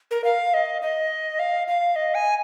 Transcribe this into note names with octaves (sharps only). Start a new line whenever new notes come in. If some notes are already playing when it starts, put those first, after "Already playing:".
A#4
F5
D#5
D#5
F5
F5
D#5
G#5